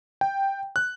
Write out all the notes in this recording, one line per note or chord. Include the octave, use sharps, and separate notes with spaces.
G5
F#6